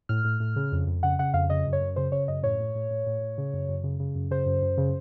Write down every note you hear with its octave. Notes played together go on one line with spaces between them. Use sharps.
A2 F6
A2
A2
C#3
F2
F2
C#3 F#5
C#3 F#5
F2 F5
C#3 D#5
F#2
C#5
F#2
C#3 C5
C#3 C#5
F#2 D#5
A2 C#5
A2
A2
A2
A2
A2
C#3
F#2
F#2
C#3
C#3
F#2
C#3 C5
F#2
F#2
C#3